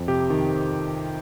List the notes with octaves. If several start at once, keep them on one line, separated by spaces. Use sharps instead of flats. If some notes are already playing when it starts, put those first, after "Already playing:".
Already playing: F2
C3 G4
D#3